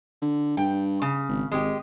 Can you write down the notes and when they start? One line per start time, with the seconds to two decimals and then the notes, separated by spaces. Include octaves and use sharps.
0.22 D3
0.57 G2 G5
1.02 C#3
1.29 G#1
1.52 G#1 G#3 G4